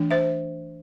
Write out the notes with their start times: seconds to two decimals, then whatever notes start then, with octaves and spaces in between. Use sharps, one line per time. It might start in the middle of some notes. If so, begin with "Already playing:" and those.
Already playing: E3 A3 D4
0.11 C5 E5